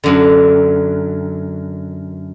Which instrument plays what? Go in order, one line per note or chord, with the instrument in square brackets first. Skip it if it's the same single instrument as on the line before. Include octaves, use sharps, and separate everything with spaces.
[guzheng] F#2 D3